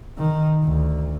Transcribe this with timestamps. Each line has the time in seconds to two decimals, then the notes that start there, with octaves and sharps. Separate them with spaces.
0.18 D#3
0.64 D2